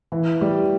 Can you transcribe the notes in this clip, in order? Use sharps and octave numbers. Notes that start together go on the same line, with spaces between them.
E3
G3